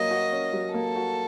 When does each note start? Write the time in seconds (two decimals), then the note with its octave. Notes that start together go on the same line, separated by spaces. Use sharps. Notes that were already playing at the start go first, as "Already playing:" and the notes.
Already playing: F#3 A#3 C#4 D#5
0.11 F#4
0.32 C#4
0.53 F#3
0.74 A#3 A4
0.96 F#4